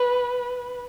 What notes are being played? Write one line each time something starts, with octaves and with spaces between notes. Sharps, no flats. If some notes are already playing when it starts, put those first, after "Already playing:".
Already playing: B4